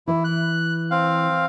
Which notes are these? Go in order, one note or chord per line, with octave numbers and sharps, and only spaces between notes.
E3 E4
F#6
C4 F5